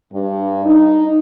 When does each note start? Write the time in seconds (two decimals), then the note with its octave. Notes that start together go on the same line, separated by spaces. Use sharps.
0.13 G2
0.65 D#4